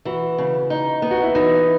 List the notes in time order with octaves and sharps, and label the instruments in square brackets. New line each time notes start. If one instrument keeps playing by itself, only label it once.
[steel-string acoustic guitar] E3 [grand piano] F#4
[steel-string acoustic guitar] C#3
D#4
B3
[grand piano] F#4
E4
[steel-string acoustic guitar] E3 [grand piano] D#4